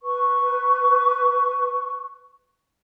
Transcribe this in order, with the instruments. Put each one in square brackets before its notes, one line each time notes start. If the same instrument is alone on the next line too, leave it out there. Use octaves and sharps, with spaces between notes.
[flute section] B4 C#6